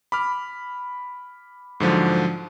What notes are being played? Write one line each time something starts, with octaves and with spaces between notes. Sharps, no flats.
B5 D6 F6
G#2 D3 F3 F#3